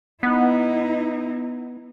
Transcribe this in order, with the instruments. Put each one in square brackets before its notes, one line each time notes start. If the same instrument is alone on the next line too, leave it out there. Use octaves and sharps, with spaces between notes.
[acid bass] B3 [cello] D#4 E4